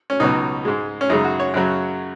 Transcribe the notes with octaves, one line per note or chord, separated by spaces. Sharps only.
C#4
C#2 B2 F#3 D#4
G#2 G#3
C#4
F#2 C#3 G#3 D#4
F#4
C#5
F#2 C#3 F#3